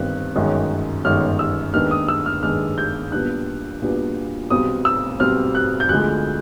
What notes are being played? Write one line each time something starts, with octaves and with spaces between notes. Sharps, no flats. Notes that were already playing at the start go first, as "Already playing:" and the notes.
Already playing: G1 G2 D#3 G3 C4 F#6
G1 F#2 D#3 G#3 C#4
G1 F#2 D#3 G#3 C#4 F6
E6
D#2 D#3 G#3 B3 D4 F6
D#6
E6
F6
D#2 D#3 G#3 B3 D4 F6
G6
B1 A#2 G3 B3 D4 F#6
B1 A#2 G3 B3 D4
B1 B2 G3 C4 D#6
E6
B1 B2 G3 C4 F6
F#6
G6
D2 D3 F3 G#3 F#6